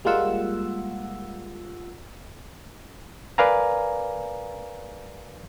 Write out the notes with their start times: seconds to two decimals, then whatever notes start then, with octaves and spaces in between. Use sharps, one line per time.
0.05 G3 G#3 A#3 F4 F#5 E6
3.38 A#4 B4 D5 F5 G#5 A#5